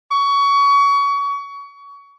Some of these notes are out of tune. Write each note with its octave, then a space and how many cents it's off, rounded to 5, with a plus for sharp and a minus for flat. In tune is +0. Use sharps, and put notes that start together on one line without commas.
C#6 +25